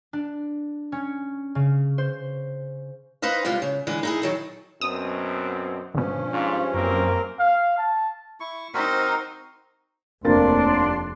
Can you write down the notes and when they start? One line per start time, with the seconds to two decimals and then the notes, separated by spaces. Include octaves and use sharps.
0.13 D4
0.92 C#4
1.55 C#3
1.98 C5
3.22 D#4 B4 C5 D#5 F5
3.45 C3 G3 G#3 F4
3.62 C#3
3.87 D3 E3 G#3 G#4
4.03 D#4 E4 G#4
4.22 D#3 F#3 A4
4.81 F#2 B2 C4 D#6
5.94 G#1 G2 B2 F3 C#4
6.32 G#2 F4
6.74 F#2 A#3 C4 A#4
7.40 F5
7.78 A5
8.40 E4 C#6
8.74 C4 D#4 F#4 A#4 C5
10.25 F1 D#2 A#3 C4 D4 C6 A6